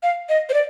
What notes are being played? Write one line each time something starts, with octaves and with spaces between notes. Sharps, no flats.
F5
D#5
C5
D5